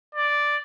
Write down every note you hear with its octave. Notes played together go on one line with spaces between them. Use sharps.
D5